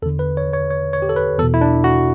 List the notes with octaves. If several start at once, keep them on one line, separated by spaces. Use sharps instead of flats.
E2 D3 A4
B4
C#5
C#5
C#5
C#5
G4
A4
B4
E2 B2 A4
E4
D4
F#4